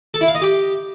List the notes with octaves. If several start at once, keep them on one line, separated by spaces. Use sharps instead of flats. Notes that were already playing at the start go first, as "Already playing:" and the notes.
A4
E4
F5
D#5
G4